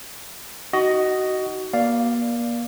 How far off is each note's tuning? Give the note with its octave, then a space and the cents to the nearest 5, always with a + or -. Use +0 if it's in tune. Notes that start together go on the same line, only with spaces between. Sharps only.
D#4 +0 F#4 +20 D#5 +0
A#3 +35 D5 +0 F5 +0